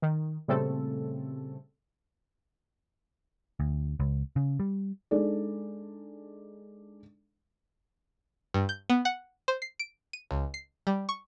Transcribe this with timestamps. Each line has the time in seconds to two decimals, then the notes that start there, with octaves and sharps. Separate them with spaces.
0.02 D#3
0.48 A#2 C#3 G3 A3 C4 A4
3.60 D2
4.00 C#2
4.36 C#3
4.60 G3
5.11 G#3 D4 D#4 G#4 A4 D5
8.54 G2
8.69 G6
8.90 B3
9.05 F#5
9.48 C5
9.62 C7
9.79 D7
10.13 D#7
10.31 C#2
10.54 C7
10.87 G3
11.09 C#6